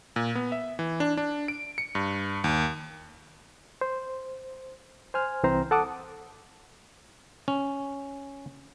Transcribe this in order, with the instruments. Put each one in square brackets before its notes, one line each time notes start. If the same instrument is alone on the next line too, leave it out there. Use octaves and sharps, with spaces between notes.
[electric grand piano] A#2
B3
E5
E3
D4
D4
D7
C#7
G2
D#2
[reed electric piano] C5
C5 G#5 F6
C2 E3 C4 C5 A#5
A4 F#5 A5 D6 D#6
[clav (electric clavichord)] C#4